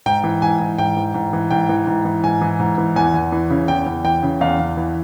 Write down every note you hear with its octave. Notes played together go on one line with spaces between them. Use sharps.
G#2 G5
E3
G#2 G#5
E3
G#2 G5
E3
G#2
E3
G#2 G5
E3
G#2
E3
G#2 G#5
E3
G#2
E3
E2 G#5
E2
E3
C#3
E2 G5
E2
E3 G5
C#3
E2 F5
E2
E3